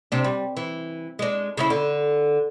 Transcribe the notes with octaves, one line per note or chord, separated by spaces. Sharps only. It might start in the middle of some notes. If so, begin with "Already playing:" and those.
C3 D4
G3
E3
G#3 D4
C#3 C#4 E4
D3